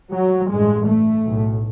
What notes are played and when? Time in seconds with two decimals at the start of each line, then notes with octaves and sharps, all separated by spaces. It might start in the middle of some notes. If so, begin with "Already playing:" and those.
0.11 F#3
0.49 A1 G2 G#3
0.87 A3
1.24 B1 A2